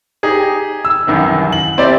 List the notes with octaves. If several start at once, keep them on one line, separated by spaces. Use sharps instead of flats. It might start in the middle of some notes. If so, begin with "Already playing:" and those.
D#4 G4 G#4
E6
C2 F#2 D#3 E3
F#7
C4 E4 G4 D5